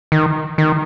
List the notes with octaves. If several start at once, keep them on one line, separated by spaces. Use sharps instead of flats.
D#3
D#3